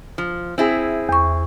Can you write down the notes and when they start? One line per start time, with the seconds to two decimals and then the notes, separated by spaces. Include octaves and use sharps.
0.18 F3
0.58 C4 E4 G#4
1.09 E2 C#6